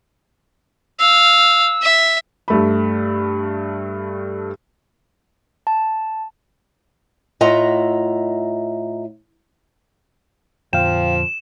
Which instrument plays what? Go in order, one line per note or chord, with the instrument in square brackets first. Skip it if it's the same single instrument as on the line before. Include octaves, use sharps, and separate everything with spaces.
[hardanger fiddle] F5 [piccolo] E6
[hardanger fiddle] E5
[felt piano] G2 A3 B5
[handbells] A5
[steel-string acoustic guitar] A2 F4 D#5 E5 F#5 A#5
[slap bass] F2 A#2 D3 [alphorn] F3 [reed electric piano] F5 G5 [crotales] E7